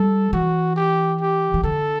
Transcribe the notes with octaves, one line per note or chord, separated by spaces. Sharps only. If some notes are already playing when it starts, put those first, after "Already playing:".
Already playing: G3 A4
E3 F#4
G4
G4
E3
D3 A4